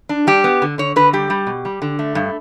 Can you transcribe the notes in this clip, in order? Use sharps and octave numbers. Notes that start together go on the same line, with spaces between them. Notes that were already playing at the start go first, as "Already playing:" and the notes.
D4
G3 G4
B3
D3
D3 C#5
D3 B4
G3 G4
G3
B2
G3
D3
A3
G2